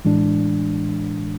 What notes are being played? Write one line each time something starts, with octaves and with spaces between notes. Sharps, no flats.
A2 E3 G#3 D4